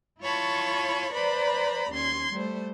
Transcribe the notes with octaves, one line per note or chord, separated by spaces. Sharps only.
E4 F4 C#5 A5 B5 C#6
B4 C5 D5 A#5 B5
D#2 C#4 C6 G#6
G3 A3 C5